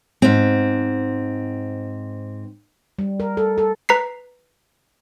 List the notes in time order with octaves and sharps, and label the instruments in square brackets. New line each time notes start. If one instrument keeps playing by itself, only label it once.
[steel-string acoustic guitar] G#2 C4
[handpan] G3
A#4
A4
A4
[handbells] B4 A#5 B6 C7